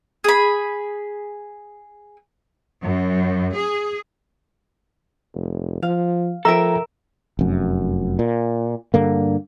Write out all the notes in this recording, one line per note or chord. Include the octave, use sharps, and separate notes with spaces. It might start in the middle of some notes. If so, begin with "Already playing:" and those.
G#4 B5
F#2
G#4
F1
F3 F5
F3 A4 A#4 E5 G5 A#5 E6
F1 F#2
A#2
G2 D3 A#3